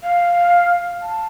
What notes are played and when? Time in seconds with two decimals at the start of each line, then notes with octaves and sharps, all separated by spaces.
0.03 F5
1.02 A5